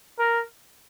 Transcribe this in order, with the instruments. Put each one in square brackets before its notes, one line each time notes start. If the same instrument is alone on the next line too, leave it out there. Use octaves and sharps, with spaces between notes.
[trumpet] A#4